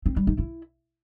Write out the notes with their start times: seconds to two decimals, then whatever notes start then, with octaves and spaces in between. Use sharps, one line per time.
0.06 C4
0.16 G3
0.27 D#4
0.38 E4